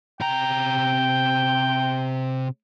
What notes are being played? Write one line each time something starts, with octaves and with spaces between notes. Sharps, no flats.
C3 G5 A#5